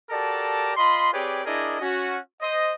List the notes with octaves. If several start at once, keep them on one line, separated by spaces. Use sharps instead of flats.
F#4 G4 A4 A#4 D5 A5
F4 D#5 B5 C6
C4 G4 G#4 B4 C#5 D5
D4 E4 G#4 A#4 D5 D#5
C#4 F#4
C5 D#5